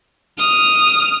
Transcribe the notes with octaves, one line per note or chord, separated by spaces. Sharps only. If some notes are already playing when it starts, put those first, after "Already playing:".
D#6 F6